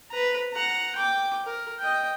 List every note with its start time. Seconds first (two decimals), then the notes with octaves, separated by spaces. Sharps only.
0.10 B4 A#5
0.52 F#5 A#5
0.96 G5 D6
1.46 A#4
1.79 D#5 G5